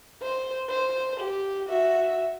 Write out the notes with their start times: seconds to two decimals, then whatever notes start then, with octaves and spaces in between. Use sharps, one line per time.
0.22 C5
0.69 C5
1.20 G4
1.69 F#4 E5